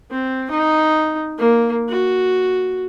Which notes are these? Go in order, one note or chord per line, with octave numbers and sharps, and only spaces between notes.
C4
D#4
A#3
F#4